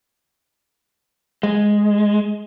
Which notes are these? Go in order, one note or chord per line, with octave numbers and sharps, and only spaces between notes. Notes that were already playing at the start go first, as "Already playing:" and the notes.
G#3